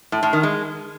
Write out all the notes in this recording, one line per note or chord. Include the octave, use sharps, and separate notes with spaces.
A2
A2
D#3
G#3